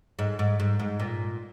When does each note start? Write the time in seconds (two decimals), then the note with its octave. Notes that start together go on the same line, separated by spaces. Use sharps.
0.19 G#2
0.39 G#2
0.60 G#2
0.79 G#2
1.00 A#2